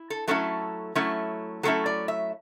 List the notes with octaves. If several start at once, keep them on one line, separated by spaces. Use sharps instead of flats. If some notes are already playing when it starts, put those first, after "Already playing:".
Already playing: E4
A4
F#3 A3 C#4 E4 A4
F#3 A3 C#4 E4
F#3 A3 C#4 E4 A4
D5
E5